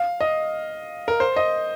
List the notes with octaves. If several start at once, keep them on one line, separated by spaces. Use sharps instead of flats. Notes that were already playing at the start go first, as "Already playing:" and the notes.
Already playing: F5
D#5
A#4
C5
D#5